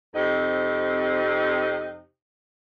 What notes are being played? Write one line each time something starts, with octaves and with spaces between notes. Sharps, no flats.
F2 C3 C4 D#4